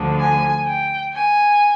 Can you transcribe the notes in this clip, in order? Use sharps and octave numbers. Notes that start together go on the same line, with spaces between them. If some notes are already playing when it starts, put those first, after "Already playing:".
Already playing: D2 D3 F3
G#5
G5
G#5